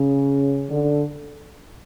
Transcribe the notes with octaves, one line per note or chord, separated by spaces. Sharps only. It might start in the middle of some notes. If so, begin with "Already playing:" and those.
Already playing: C#3
D3